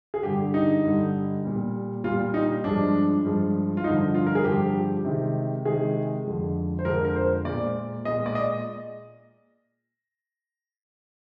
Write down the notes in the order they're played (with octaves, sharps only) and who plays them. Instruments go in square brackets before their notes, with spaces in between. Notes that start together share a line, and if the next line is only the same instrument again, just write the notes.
[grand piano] G#4
G2 D3 G3 G4
D#4
G2 D3 G3
A#2 G3
A#2 G3 F4
D#4
G2 F3 G#3 D4
G2 F3 G#3
F4
G2 D3 F3 D#4
F4
A#4
G#4
G2 D3 F3 G4
C3 D#3 G#3
C3 D#3 G#3 G#4
F2 D3 F3 G#3
C5
F2 D3 F3 G#3 A#4
A#4
C5
A#2 G#3 D5
A#2 G#3 D#5
D5
D#5